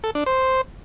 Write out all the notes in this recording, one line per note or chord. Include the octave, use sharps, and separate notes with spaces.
A4
D4
C5